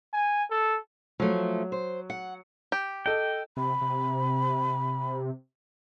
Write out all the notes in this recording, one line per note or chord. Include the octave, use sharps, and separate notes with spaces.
G#5
A4
F3 F#3 A3
C5
F#5
G4
A4 D#5 G5
C3 B5
C3